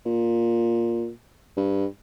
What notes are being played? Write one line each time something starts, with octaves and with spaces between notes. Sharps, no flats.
A#2
G2